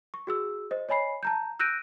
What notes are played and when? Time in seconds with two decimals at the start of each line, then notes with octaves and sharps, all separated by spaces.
0.14 C#6
0.27 F#4 G#4 E6
0.71 C5 D#5
0.89 C#5 D#5 G#5 B5 C7
1.23 A5 A#5 G6
1.59 E6 F#6 G6 A#6 D7 D#7